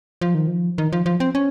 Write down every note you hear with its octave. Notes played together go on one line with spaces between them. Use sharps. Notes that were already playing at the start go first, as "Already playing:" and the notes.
F3
D#3
F3
D#3
F3
F3
C4
C#4